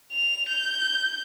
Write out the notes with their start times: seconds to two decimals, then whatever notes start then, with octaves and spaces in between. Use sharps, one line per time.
0.12 F7
0.49 G6